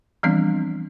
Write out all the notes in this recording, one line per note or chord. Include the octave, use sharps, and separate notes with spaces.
E3 F3 G3 B3 C4 D4